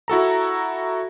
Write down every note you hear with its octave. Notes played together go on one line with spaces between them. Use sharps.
E4 F#4 A4 A#5